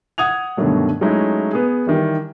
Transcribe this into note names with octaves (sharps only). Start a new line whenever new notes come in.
F#5 D#6 G#6 F7
G2 B2 D3 D#3 F#3 A3
F#3 G#3 A3 C#4 D#4 E4
B3 G#4
D#3 E3 G3